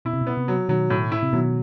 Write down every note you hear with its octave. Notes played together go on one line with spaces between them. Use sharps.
B2 E4
C3
B2
B3
C3
F#3
B2 D#3 F#3
A2
E4
C3
B2 D#3 F#3